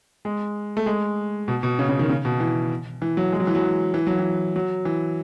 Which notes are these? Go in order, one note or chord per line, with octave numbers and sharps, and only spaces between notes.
G#3
A3
G#3
B2
B2
C#3
C#3
D#3
C#3
B2
E3
E3
F#3
G#3
F#3
E3
F#3
E3
F#3
E3
F#3
E3